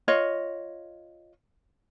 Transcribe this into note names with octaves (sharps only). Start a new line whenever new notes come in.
F4 C#5 D#5